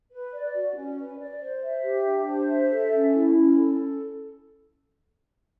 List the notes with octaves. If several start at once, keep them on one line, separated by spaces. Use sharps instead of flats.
B4
D5
F#4
C#4
B4
D5
C5
E5
G4
D4
C5
E5
A4
C#4
E4
C#4
A4